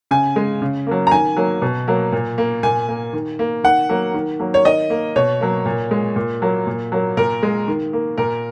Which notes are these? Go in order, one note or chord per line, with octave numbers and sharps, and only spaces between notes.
C#3 G#5
G#3
C#3
F#3 A#3
A#5
D#3 G#5
F#3 A#3
B2
F#3 A#3
A#2
A#3
A#2 G#5
A#3
D#3
A#3
D#3 F#5
F#3 A#3
D#3
F#3 A#3
C#5
D#3 D#5
A#3
B2 C#5
F#3 A#3
A#2
G#3
A#2
F#3 A#3
A#2
F#3 A#3
A#2 A#4
G#3
D#3
A#3
A#2 A#4